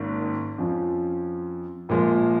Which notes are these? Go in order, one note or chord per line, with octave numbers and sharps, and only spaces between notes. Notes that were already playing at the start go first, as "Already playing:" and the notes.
Already playing: G#1 G#2 D#3 A#3 C#4
F2 F3 C#4 F4
A#1 A#2 F3 G#3 F4